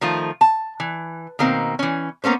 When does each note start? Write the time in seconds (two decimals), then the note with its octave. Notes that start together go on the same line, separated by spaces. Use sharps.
0.01 D#3 F3 A3 F4
0.41 A5
0.80 E3
1.39 B2 D#3 A#3 C4
1.79 E3 C#4
2.24 A#3 B3 C#4 C5